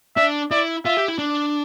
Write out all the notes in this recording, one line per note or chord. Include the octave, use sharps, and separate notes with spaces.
D4 E5
E4 D5
F4 E5
G4
E4
D4